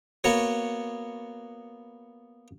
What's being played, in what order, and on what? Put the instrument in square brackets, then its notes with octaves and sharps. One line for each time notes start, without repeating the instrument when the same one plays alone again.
[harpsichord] A#3 B3 F#4 C#5